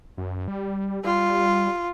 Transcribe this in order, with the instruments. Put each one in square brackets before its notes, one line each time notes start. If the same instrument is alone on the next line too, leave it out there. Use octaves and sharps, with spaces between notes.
[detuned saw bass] F#2
G3
[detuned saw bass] G3 [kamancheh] F4